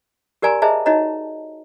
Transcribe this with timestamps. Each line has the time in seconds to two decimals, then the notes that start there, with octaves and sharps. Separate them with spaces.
0.42 G4 A#4 D5 G#5 A#5 C6
0.62 G#4 C5 D#5 E5 A5 A#5
0.86 D#4 F#4 C#5 D#5 A#5